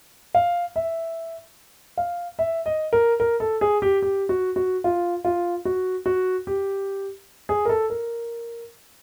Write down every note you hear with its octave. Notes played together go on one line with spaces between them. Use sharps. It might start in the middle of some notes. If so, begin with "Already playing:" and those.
F5
E5
F5
E5
D#5
A#4
A#4
A4
G#4
G4
G4
F#4
F#4
F4
F4
F#4
F#4
G4
G#4
A#4
A4
A#4